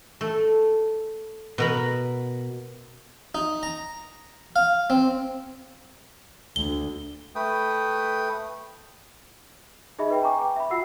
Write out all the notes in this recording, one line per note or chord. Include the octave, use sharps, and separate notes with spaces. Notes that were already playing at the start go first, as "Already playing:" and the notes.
A3
B2 A#4 B5
D#4
A#5
F5
C4
D2 G7
A3 B4 G5 D#6
D#4 G#4 D#5 E5 B5
B4 G5
G5 G#5 A#5 C#6 D6
G5
E5 B5
F4 F#4 F#5 E6 C7